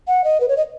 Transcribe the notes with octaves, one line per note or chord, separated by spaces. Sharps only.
F#5
D#5
B4
C#5
D#5